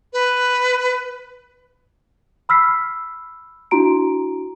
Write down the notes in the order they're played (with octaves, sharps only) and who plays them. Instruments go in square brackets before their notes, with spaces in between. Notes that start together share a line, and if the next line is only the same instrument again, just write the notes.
[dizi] B4
[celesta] B5 E6 F6 B6 C7
D4 E4 F#4 A#5 D7